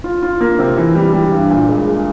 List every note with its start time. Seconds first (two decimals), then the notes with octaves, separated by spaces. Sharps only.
0.04 F4
0.23 F4
0.41 A#3
0.59 C3
0.77 E3
0.95 G3
1.14 G3
1.32 G2
1.51 A#2
1.69 G#3
1.87 G#3